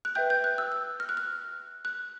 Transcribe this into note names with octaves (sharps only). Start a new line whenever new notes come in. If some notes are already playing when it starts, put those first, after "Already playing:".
F#6
B4 E5 G5 G6
G6
F#6
E6
E6
F6
F#6
F6
F#6